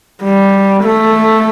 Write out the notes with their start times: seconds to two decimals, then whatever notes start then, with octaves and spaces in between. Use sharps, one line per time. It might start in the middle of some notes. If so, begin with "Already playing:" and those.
0.23 G3
0.83 A3